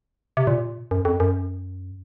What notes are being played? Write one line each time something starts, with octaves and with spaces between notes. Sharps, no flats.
C3
A#2
F#2
F2
F#2